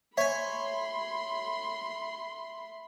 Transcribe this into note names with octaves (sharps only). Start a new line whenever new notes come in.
C#5 E5 G#5 B5 C6